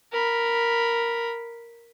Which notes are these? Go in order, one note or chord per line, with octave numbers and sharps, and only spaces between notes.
A#4 B5